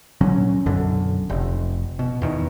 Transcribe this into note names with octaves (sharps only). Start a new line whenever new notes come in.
A#2 D3 F#3 C#4
B1 F#2 D3
F1
B2
E2 B2 D#3